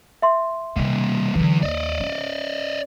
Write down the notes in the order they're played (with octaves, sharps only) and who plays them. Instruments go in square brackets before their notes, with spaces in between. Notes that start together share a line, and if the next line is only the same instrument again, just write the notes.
[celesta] E5 C6
[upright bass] C3 D#3 [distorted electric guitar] G3 A#3
[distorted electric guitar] E2 [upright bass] D3 F#3
[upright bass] D#2 [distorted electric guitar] D5 D#5
[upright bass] C#4